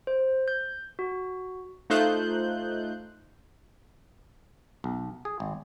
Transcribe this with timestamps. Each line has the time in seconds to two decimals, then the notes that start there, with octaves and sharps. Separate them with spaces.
0.07 C5
0.48 G6
0.99 F#4
1.90 A3 D#4 F4 C5 F#6 G6
4.84 B1
5.25 G#4
5.40 G#1